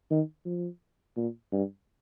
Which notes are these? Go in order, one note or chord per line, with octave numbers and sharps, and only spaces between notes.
D#3
F3
A#2
G2